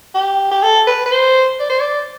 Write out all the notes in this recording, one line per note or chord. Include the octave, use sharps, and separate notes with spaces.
G4
G4
A4
B4
B4
C5
D5
C5
D5